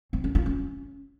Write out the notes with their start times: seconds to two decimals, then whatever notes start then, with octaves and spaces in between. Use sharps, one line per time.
0.13 C4
0.24 C#4
0.35 F4
0.46 C#4